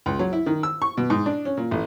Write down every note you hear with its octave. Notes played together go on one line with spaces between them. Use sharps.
C#2
F#3
E4
D#3
E6
C#6
B2
G#2
D4
C#4
A#2
A1